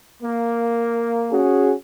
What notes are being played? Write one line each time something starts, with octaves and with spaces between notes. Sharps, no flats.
A#3
C#4 F#4 G#4